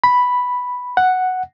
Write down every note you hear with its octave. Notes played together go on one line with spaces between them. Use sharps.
B5
F#5